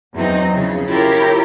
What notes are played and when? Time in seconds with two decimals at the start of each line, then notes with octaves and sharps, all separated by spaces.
0.15 E2 F#3 C4 D#4
0.52 F2 C#3
0.88 E4 F4 G4 A#4 C#5